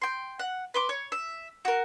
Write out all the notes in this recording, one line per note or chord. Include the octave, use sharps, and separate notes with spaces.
G5 C6
F#5
B4 C6 D6
C#5
E5
F#4 A#4